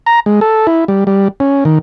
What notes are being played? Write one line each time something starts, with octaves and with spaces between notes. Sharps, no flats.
A#5
G#3
A4
E4
G3
G3
C#4
D#3